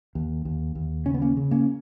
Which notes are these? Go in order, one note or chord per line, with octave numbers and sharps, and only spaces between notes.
D#2
D#2
D#2
C#3 C#4
B3
A#3 C#4
C#3
A#3 C#4